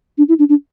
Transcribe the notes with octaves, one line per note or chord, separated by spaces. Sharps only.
D4
E4
D4
D4